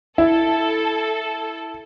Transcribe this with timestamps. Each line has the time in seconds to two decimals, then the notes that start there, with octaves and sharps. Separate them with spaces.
0.18 E4 A4